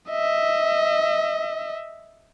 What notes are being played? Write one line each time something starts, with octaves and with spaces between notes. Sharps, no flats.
D#5 E5